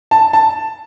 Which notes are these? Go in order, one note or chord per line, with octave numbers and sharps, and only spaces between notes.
A5
A5